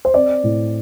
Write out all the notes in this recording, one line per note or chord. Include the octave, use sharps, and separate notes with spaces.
C5
C4 D5
A2